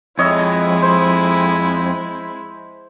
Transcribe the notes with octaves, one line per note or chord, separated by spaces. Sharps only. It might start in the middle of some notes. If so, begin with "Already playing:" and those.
F2 G#3 E4 C#5 D#5 E5
C5